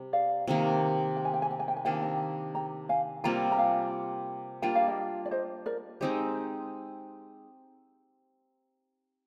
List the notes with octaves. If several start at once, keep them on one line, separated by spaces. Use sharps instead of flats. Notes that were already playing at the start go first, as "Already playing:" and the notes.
Already playing: C3 G3
D5 F5
C3 D#3 A#3
G5
G#5
G5
G#5
G5
G#5
G5
G#5
C3 D#3 A#3 D4 G5
G#5
D#5 G5
G5 A#5
F5 G#5
C3 G3 A#3 F4 G5 A#5
A#5
F5 G#5
G3 A#3 D4 F4 G5
F5
D#5 G5
D5
C5 D#5
A#4 D5
G#3 C4 D#4 G4 C5 D#5